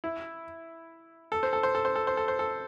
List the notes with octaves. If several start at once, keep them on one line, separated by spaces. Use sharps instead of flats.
E4
A4
C5
A4
C5
A4
C5
A4
C5
A4
C5
A4